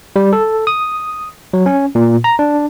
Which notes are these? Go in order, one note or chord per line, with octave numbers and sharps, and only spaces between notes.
G3
A4
D#6
F#3
C#4
A#2
A#5
D4